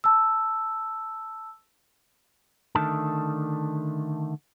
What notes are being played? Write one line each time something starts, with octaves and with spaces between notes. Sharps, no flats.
A5 E6
D3 D#3 A3 A5